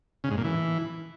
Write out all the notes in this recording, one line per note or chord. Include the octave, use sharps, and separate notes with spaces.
C#3
G#2
A#2
E3